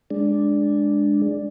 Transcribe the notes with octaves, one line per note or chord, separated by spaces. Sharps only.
G#3 D4